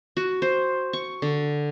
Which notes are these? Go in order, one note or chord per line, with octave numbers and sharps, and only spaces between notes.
F#4
C5
C#6
D3